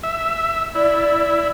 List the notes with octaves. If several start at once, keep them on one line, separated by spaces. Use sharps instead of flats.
E5
E4 D5